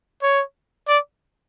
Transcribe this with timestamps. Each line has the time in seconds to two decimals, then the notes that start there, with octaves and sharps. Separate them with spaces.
0.22 C#5
0.88 D5